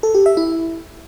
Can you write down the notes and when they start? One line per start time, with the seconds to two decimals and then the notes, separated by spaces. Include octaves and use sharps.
0.03 A4
0.15 G4
0.26 E5
0.37 E4